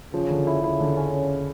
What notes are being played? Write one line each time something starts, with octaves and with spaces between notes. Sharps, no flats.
C#3 F3
D3
E4
C#3 E4
D3
C#4